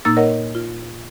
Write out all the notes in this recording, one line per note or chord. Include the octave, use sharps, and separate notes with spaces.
A#2 A#3 D#4 E6 A6
A#4 C#5 D#5 F#5
F4